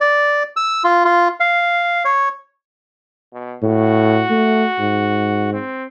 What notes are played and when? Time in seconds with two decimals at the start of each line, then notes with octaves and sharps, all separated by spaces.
0.01 D5
0.56 E6
0.84 F4
1.05 F4
1.40 F5
2.05 C#5
3.33 B2
3.62 A2 F#4
4.30 A3
4.79 G#2
5.53 C4